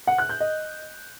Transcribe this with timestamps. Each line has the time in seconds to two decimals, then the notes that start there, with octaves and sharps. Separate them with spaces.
0.07 F#5
0.18 F#6
0.29 G6
0.40 D#5